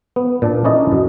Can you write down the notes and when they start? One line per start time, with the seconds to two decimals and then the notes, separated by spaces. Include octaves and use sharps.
0.16 B3
0.42 A#2 D4 A5
0.65 C#4 D#4 E4 A4 D5 D#5
0.92 F#2 F#3